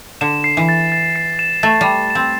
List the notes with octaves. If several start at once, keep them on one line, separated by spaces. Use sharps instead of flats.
D3 E7
C7
E3
A6
A6
C7
E7
A3 A6
G3
E7
C4 E7